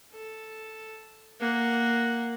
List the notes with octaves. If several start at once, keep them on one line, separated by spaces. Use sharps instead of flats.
A4
A#3 F#5